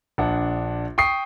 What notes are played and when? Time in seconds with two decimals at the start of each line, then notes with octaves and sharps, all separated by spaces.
0.18 A#1 D4 F#5
0.98 G5 C#6 D#6 C7